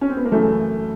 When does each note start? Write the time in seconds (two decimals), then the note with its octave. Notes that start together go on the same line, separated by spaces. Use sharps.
0.01 C#4
0.10 C4
0.17 B3
0.25 A#3
0.31 F#2 C#3 E3 A3